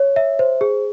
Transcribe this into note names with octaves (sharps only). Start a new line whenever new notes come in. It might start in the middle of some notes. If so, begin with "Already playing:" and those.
Already playing: C#5
E5
C5
G#4